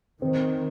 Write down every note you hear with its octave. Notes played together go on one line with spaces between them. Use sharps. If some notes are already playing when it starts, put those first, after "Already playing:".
D#3 C4